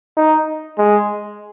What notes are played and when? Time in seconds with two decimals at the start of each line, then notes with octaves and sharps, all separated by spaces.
0.17 D#4
0.78 G#3